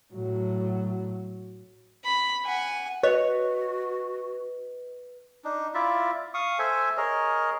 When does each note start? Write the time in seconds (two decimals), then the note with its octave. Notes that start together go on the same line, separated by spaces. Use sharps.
0.14 A2 F#3
2.06 B5
2.45 F#5 G#5
3.03 F#4 B4 C#5 D#5
5.44 D4 D#4
5.74 E4 F4 D5 E5
6.34 F5 C#6 D#6
6.59 A4 C5 E5 G#5
6.97 G#4 A#4 C#5 D#5